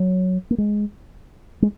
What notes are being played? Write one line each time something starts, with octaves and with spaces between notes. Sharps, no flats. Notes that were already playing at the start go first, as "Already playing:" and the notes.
Already playing: F#3
A#3
G#3
G#3